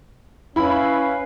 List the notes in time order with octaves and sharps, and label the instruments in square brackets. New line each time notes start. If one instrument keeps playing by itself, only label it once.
[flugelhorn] C#4 [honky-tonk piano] E4 B5 [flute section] B4 F5